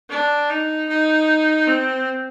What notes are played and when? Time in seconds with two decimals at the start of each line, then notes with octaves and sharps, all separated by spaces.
0.10 D4
0.50 D#4
0.89 D#4
1.67 C4